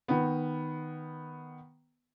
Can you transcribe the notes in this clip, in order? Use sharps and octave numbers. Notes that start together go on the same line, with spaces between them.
D#3 B3